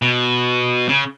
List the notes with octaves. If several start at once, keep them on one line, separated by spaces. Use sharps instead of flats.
B2
C#3